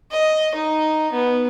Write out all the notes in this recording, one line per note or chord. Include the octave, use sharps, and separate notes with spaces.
D#5
D#4
B3